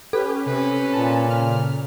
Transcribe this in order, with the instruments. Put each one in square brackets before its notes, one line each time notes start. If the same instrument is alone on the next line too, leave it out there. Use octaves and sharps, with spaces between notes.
[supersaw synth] C#4 G4 B4 [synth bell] A4
[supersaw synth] C3 [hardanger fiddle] C#4 B4
[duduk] A#2 [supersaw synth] A5
[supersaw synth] C#3 F6